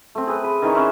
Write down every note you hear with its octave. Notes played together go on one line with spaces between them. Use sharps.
A3 C4
G#4 B4
B4
D#3 E3 D#4 C#5
C#4 B4 C5 E5